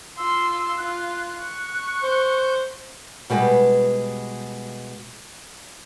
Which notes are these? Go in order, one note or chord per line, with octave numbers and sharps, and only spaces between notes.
F4 C6 E6
F4 F#6
C#6
C5
B2 G3 G#3 B4